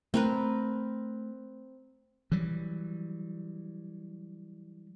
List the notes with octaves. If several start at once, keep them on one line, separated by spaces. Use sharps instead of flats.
A3 C4 A#4 B4
E3 F#3 G3